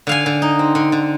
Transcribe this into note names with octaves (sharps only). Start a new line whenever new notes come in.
D3 F5 G#5
D3
D#4
C4
D3
D3